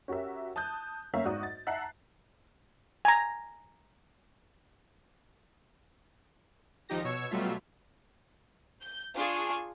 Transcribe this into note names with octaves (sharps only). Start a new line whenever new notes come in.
C#4 F#4 G4 A#4 E5
A5 D#6 F#6 G6
G1 A#3 C#4 E5 F5 A#5
G#2 F#4 D5 D#6
A6
E5 F#5 A5 A#5 F#6 C7
G#5 A#5
G#1 F3 D#4 G4 A#6
B2 C#5 C#6 E6 G#6
B2 F#3 G3 A3 F4 E5
G6
D4 F4 G#4 C#6